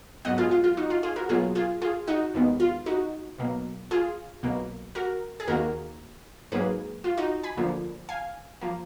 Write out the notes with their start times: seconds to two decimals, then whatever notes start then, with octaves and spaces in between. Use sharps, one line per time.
0.25 G#2 F#3 B3 D#5 F#5
0.38 F4 G#4
0.51 F4
0.64 F4
0.77 D#4 F#4
0.90 F4
1.03 F4 G#4
1.16 F#4 A#4
1.29 B1 B2 F#3 A#3 F4 G#4
1.55 F4 G#4
1.82 F4 G#4
2.07 D#4 F#4
2.34 D#2 D#3 G#3 B3
2.60 F4
2.86 D#4 F#4
3.38 B1 B2 A#3
3.91 F4 G#4
4.43 B1 B2 A#3
4.95 F#4 A#4
5.40 G#4
5.48 D#2 D#3 A#3 F#4 A#4
6.52 G#2 F#3 A#3 G#4 B4
7.04 F4
7.17 D#4 F#4
7.43 G#5 B5
7.57 D2 D3 F3 A#3
8.09 F5 G#5
8.61 F3 A#3